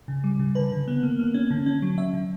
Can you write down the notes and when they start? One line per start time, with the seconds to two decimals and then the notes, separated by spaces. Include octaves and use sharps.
0.08 C#3
0.24 G3
0.39 C#3
0.55 D3 B4
0.72 D3
0.88 B3
1.03 A#3
1.19 A#3
1.34 C#4
1.51 D3
1.66 C#4
1.82 F#3
1.97 F#3 E5
2.14 D3